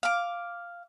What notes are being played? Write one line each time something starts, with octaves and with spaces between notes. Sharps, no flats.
F5 D6